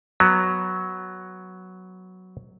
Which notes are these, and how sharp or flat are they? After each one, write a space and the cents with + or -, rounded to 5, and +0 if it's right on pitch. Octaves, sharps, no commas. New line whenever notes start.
F#3 +0 B3 +0